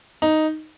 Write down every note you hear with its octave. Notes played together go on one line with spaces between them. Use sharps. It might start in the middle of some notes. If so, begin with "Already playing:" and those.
D#4